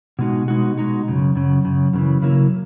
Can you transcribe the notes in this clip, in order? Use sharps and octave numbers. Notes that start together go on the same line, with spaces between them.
B2 G#3 D#4 F#4
B2 G#3 D#4 F#4
B2 G#3 D#4 F#4
F#2 C#3
F#2 C#3
F#2 C#3
F#2 C#3 E3
C#3 F#3 A#3 E4